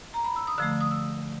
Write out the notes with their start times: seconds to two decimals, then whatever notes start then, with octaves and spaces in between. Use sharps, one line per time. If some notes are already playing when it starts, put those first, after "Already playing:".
0.14 A#5
0.24 B5
0.36 E6
0.47 D#6
0.58 D3 F3 A3 E6
0.81 D#6
0.91 E6